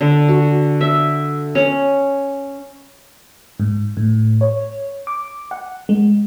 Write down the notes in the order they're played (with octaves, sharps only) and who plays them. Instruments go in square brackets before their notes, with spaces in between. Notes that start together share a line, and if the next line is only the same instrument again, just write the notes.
[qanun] D3
F#4
E5
C#4
[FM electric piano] G#2
A2
C#5
D6
F#5
G#3